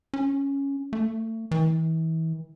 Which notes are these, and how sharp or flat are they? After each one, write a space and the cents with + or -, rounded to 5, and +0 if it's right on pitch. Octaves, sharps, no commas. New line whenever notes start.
C#4 +0
A3 +30
E3 -35